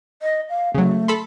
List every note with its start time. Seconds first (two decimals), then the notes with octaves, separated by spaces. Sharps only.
0.22 D#5
0.49 F5
0.75 C#3 F#3 A3
1.08 A4 B5 C6